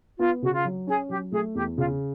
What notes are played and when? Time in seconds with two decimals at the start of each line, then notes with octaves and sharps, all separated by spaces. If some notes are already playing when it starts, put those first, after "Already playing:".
0.19 B3 F4
0.42 C#3 F#4
0.53 F4
0.65 F#3
0.87 C#4 G#4
1.10 F#3 G4
1.32 A3 G#4
1.55 E2 G4
1.77 C#3 F4